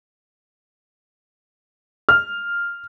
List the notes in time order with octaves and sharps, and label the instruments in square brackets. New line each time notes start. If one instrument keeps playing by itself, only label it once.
[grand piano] F6